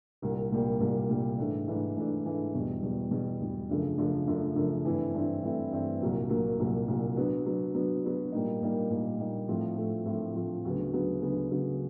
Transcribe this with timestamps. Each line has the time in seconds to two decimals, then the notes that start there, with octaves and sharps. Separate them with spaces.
0.22 C2 A#2 G3 A#3
0.52 C2 A#2 G3 A#3
0.80 C2 A#2 G3 A#3
1.09 C2 A#2 G3 A#3
1.38 G#2 E3 A3 D4
1.67 G#2 E3 A3 D4
1.96 G#2 E3 A3 D4
2.25 G#2 E3 A3 D4
2.54 E2 B2 G3
2.82 E2 B2 G3
3.11 E2 B2 G3
3.41 E2 B2 G3
3.69 F#2 C#3 F3 A3 D4
3.98 F#2 C#3 F3 A3 D4
4.27 F#2 C#3 F3 A3 D4
4.56 F#2 C#3 F3 A3 D4
4.85 G2 E3 A3 C4 E4
5.14 G2 E3 A3 C4 E4
5.43 G2 E3 A3 C4 E4
5.72 G2 E3 A3 C4 E4
6.00 C2 A#2 F#3 A#3
6.29 C2 A#2 F#3 A#3
6.60 C2 A#2 F#3 A#3
6.88 C2 A#2 F#3 A#3
7.16 F#3 B3 D4
7.46 F#3 B3 D4
7.74 F#3 B3 D4
8.04 F#3 B3 D4
8.32 A#2 G3 A#3 D#4
8.62 A#2 G3 A#3 D#4
8.90 A#2 G3 A#3 D#4
9.19 A#2 G3 A#3 D#4
9.48 A2 F3 A3 C4 F4
9.77 A2 F3 A3 C4 F4
10.06 A2 F3 A3 C4 F4
10.35 A2 F3 A3 C4 F4
10.65 D2 C#3 F#3 B3
10.93 D2 C#3 F#3 B3
11.22 D2 C#3 F#3 B3
11.51 D2 C#3 F#3 B3